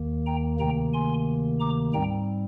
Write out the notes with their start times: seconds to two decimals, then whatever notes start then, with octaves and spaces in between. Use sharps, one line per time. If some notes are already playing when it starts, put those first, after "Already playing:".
Already playing: D#2 D#3 A#3
0.26 G5 A#5
0.60 D2 C3 D#3 A#3 G5 A#5
0.93 G#5 C6
1.60 A#5 D6
1.94 G#2 G3 C4 G5 A#5